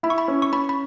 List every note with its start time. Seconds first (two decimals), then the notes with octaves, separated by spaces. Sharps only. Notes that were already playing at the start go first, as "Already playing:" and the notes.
0.03 E4 B5
0.10 C#6
0.18 B5
0.28 C#4
0.42 C#6
0.52 C#4 B5
0.69 B5